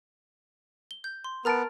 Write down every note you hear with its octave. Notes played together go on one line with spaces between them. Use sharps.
G7
G6
C6
B3 A#4 A5 A#5 F6 A6 D7